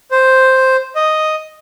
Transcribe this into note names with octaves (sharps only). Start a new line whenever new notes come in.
C5
D#5